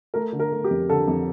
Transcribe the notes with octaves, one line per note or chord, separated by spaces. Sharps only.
A3 A#4
D3
A#4
A3
G4
F2
D3 A4
F2